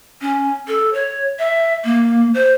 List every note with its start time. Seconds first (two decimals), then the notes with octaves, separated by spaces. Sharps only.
0.21 C#4
0.68 A4
0.94 C#5
1.39 E5
1.85 A#3
2.34 C5